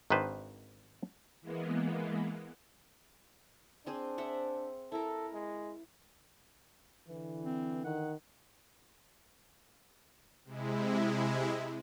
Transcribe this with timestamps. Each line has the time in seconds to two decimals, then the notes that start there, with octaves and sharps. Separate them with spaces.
0.10 G#1 D#3 D4 B4 C5
1.41 E3 G#3 A#3 B3
3.86 C4 D4 G#4 C5
4.18 C4 E5 F#5
4.92 E4 A4 A#4
5.33 G#3
7.07 D3 E3
7.44 C4
7.85 D#3 F#5
10.45 C3 G#3 E4